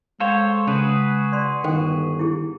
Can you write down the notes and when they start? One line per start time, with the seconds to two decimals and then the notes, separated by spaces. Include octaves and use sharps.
0.20 G#3 A4 C5 C#5 F5 G5
0.67 C#3 F#4 G#4 B4
1.32 D5 C6
1.64 G1 D#3 A4 C5 G5
2.19 E4 G4 G#4